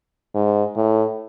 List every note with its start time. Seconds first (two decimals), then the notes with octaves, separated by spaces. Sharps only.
0.35 G#2
0.76 A2